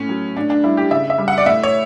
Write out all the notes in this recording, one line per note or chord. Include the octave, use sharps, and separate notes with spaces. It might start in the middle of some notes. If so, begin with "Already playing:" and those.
Already playing: A2 C#4
F#3
A2 D4
D4
G3 E4
G4
C#3 E5
E5
G3
F#5
D5
A2 E5
C#5